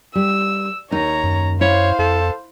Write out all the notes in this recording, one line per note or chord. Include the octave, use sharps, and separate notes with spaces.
G3 E6
D#2 D#4 C#5 A#5
F#2
E4 C5 C#5 F5
F2 A4